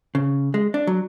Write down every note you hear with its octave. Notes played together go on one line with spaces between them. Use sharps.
C#3
G#3
D4
F#3